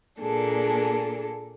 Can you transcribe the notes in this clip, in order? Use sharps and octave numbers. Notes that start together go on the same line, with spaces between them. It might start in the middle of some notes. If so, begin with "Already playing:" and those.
A#2 A#3 D4 G#4 A4